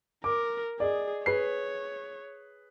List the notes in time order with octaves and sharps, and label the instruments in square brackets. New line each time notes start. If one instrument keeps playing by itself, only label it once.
[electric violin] A#4 [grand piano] D6
[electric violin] G#4 [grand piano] D5 D#5
[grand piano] G#4 B4 C7 [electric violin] C#5